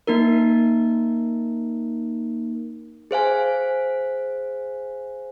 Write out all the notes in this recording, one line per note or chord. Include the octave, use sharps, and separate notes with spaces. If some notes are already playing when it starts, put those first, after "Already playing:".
A#3 D#4 A#4
G#4 C5 F5 G#5